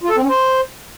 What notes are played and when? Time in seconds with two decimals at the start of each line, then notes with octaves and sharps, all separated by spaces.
0.03 F4
0.10 A4
0.16 C4
0.23 C#4
0.29 C5